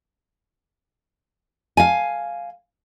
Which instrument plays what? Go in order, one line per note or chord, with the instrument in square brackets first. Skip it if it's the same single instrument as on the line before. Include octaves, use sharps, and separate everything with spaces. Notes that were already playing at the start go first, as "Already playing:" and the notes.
[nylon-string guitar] F5 G#5